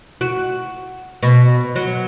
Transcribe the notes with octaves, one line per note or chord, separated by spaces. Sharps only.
F#4
B2
F#3